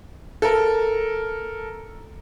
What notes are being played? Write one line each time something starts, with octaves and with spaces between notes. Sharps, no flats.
A4 A#4